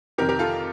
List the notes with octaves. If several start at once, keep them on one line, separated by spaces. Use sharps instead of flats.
F2 C3 D#3 G4 A#4
G4 A#4
F4 A4